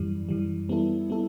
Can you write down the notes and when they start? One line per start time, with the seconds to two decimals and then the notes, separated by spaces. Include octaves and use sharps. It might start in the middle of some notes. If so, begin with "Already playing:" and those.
Already playing: F#2 E3 G3
0.29 F#2 E3 G3
0.69 G3 B3 E4 A4
1.09 G3 B3 E4 A4